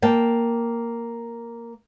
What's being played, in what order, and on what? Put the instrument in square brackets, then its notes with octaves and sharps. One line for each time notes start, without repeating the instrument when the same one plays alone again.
[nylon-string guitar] A#3 G5 A5